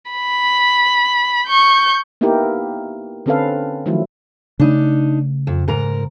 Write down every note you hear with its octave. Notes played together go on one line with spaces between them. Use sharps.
B5
C#6 G6
A#3 B3 D#4 E4 G4 A#4
D3 C4 C#4 A4 B4 F5
D#3 F3 F#3 A3 E4
C#3 A3 D4 D#4
F2
G#2 A#4 A#5